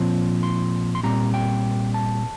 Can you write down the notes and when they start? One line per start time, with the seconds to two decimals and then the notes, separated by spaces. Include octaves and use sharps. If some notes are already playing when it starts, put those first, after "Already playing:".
Already playing: A#2 F3 C4
0.43 C6
0.95 C6
1.03 A#2 G3 C4 A#5
1.34 G5
1.94 A5